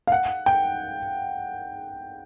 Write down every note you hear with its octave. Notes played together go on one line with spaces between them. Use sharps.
F5
F#5
G5